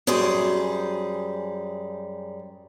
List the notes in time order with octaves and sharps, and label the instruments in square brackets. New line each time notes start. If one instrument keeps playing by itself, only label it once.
[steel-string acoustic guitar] F#2 G3 G#4 C5